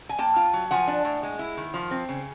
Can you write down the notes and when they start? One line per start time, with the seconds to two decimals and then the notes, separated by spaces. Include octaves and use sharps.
0.09 G#5
0.18 A#3 G5 A5
0.36 F4
0.53 F#3
0.71 F3 F#5 G#5
0.87 D4
1.05 A2
1.23 G#3
1.39 E4
1.57 D#3
1.74 F3
1.91 C4
2.09 C#3